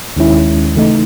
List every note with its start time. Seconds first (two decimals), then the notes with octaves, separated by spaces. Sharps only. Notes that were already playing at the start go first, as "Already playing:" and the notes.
0.16 D#2 D#3 G#3 C#4 E4
0.75 C#3 E3 A3 D#4